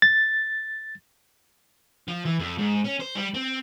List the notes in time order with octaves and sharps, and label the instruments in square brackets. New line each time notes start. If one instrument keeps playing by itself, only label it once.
[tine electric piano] A6
[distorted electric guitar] F3
E3
F2
G#2
C#4
C5
G3
C4